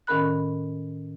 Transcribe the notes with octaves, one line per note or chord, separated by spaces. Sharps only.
A2 D#3 C#4 A#4 B5 F#6